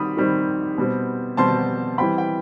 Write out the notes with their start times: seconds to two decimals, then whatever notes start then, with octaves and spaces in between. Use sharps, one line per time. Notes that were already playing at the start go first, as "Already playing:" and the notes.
Already playing: D#3 G3 C4 B5 D#6
0.17 D#3 G3 C4
0.78 B2 G3 C4
1.37 B2 G3 C4 A5 C6
1.98 E3 G3 C4 G5 B5
2.18 G5